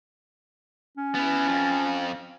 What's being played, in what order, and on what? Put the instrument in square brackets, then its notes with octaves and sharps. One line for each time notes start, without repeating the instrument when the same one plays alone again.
[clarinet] C#4
[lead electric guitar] B3 E4
F2 F3